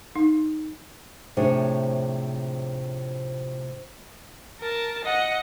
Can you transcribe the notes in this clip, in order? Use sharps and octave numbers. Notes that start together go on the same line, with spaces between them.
D#4
A2 C3 F3 D4 G#4 C#5
A#4 A5
D#5 F#5